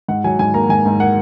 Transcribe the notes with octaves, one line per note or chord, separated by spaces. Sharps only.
G#2 F#5
F#3 G#5
G#2 G#5
A#3 A#5
G#2 G#5
G#2
A#3 F#5